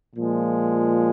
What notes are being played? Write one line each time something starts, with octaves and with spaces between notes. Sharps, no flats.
A#2 F3 G#3